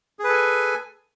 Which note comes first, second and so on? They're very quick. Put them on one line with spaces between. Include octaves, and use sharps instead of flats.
G#4 B4 A4 G#5